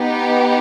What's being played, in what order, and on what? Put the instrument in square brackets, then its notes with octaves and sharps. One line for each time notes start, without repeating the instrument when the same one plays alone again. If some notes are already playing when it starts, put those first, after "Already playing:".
Already playing: [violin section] B3 D#4 G4